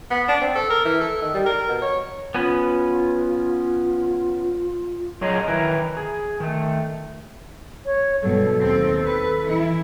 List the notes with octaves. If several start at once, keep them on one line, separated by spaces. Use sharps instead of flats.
B3
D4
C4
A4
A#4
E3
A4
D#3
G3
A#4
B2
C#5
B3 C#4 F4 B4
F#3 F4 G#4 A#4 C#5 D#5
D#3 E3 E4 A#4 B4
G#4
D#3 A3
C#5
G2 B2 F#3 A4
D#2 C4
B4
E3 E4